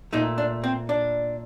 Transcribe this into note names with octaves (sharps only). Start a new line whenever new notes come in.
A#2 A3 D#4
D4
C4
D4